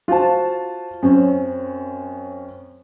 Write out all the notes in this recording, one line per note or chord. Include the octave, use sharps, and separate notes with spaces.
F4 F#4 C5 A5
F#2 C4 C#4